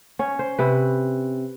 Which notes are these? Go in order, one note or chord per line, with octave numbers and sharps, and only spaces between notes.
C#4 C#5
C5
C3 B4